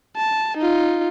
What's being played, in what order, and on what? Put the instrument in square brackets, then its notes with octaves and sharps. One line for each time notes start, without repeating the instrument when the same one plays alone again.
[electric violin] A5
D#4 F4